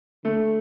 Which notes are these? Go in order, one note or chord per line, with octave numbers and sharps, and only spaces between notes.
D3 A3